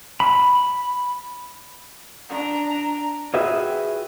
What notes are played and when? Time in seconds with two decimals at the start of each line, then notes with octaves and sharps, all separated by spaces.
0.20 B5
2.29 D4 A#5
3.34 F4 F#4 G#4 B4 E5 G5